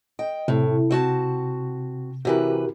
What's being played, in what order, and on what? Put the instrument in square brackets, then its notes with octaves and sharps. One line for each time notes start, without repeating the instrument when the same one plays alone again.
[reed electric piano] D#5 [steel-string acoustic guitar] G5
[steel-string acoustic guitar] A2 [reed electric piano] C3
[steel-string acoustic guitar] C4 F#4 A5
[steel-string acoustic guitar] C3 E3 B4 [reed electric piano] F#4 G4 A#4